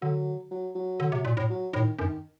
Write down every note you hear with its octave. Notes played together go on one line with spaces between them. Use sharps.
D3 F#3
F#3
F#3
D3
C3
A#2
A2
F#3
A2 D#3
F#2 D#3